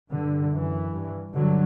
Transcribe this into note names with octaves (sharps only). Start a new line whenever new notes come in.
G2 D3
F#2 E3
G2
G2 D3 F#3